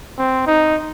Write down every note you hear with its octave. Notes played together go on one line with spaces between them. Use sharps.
C4
D#4